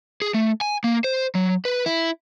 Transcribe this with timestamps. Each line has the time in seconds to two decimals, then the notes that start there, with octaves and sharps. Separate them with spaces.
0.22 G#4
0.34 A3
0.61 G#5
0.84 A#3
1.04 C5
1.35 F#3
1.65 B4
1.86 E4